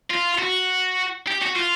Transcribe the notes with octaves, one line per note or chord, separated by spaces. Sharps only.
F4
F#4
G4
F#4
F4